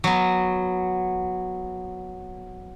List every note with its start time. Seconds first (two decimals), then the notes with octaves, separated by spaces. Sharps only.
0.04 F#3 B3